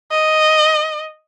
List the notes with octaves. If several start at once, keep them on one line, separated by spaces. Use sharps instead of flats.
D#5